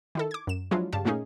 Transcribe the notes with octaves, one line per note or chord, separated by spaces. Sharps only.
D#3 E4 A4
D6 G#6
F#2 E7
F3 F#3 G#3 D4 E4 F4
G2 C#3 G4 F5 A5
A#2 A3 A#3 C#4 D#4 G#4